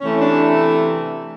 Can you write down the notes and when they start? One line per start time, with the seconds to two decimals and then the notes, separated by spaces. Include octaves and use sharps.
0.01 C3 E3 A3 C#4
0.22 D4